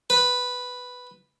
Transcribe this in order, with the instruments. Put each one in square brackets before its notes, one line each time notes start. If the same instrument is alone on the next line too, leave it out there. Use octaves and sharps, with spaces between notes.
[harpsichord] B4